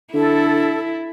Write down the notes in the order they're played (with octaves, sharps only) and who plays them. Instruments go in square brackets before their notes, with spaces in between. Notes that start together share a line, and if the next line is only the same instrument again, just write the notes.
[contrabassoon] D3 [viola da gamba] E4 [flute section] A4